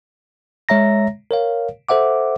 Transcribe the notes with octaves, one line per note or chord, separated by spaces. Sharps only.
G#3 C#5 E5 A#5 A#6
A#4 C#5 F5
A4 C5 E5 F#5 D6